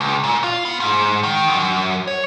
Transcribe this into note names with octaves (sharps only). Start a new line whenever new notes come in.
C#2
A#2
F4
B3
G#2
D#3
F#2
C#5